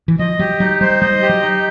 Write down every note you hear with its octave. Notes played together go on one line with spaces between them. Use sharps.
E3
F3 D#5
F#3 G4
F#3 D#4
G3 C5
G3 D#5
G4
F#3
D#4